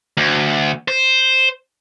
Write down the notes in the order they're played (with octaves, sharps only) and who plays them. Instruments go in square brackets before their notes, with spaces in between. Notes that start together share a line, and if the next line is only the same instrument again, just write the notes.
[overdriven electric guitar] D2
C5